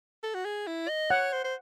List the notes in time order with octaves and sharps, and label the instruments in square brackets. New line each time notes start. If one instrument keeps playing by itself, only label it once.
[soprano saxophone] A4
F#4
G#4
E4
D#5
[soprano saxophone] C#5 [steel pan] F#5
[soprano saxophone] C5
C5